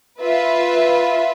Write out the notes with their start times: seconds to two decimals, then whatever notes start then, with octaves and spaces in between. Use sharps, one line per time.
0.21 F4 B4 E5